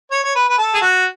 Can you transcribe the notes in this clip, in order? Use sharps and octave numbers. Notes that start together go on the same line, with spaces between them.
C#5
C#5
B4
B4
A4
G#4
F#4